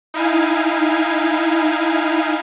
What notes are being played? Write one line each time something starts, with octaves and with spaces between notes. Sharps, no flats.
D#4 E4 F5 G#5